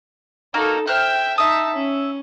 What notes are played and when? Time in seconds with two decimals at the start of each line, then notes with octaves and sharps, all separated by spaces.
0.54 A#3 D#4 F#4 A4 A#4
0.87 C5 E5 G5 F6 F#6
1.38 D#4 E5 A5 D#6
1.74 C#4